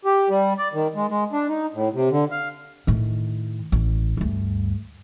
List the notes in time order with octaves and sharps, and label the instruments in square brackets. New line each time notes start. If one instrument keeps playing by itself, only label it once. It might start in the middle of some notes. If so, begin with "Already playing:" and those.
[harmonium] G4
G3
D5
D#3
G#3
G#3
D4
D#4
A2
C3
D3
F5
[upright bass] A2 D#3
A1
D2 G2